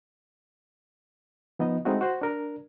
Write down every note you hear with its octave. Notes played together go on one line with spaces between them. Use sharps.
F3 B3 D#4 D#5
G#3 A3 C4 D#4 E4 F#4
F#4 C5
D4 A#4